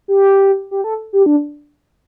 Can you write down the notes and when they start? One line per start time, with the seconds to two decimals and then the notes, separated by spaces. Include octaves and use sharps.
0.08 G4
0.71 G4
0.84 A4
1.13 G4
1.26 D4